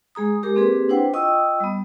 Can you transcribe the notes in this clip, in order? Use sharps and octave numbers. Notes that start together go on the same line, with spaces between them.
G#3 G#4 A#5 D#6
G#3 G4 A#4 D6
A#3 C4 G4 G#4 B4
D4 E4 B4 C5 F#5 G5
F4 D#5 G5 C#6 D#6 E6
G3 B3